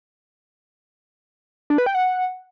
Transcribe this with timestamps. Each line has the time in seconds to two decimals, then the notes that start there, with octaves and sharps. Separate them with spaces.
1.70 D4
1.78 B4
1.86 G5
1.95 F#5